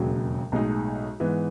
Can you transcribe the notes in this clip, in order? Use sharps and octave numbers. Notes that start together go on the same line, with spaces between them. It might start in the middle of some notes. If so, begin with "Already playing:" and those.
Already playing: E1 D#2 C#3 F#3
B1 A2 G#3 D#4
G#2 E3 B3